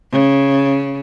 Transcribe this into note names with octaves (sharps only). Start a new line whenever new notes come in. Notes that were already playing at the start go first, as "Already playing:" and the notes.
C#3